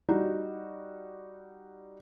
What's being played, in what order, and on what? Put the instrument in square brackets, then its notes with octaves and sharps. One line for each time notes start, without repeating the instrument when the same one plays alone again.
[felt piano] G3 D#4 F#4